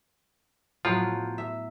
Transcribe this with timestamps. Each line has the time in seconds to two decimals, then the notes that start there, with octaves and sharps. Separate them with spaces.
0.85 A2 F3 F#3 B3 F4
1.38 E5